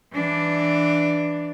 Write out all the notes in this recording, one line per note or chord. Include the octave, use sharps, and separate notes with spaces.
E3 D4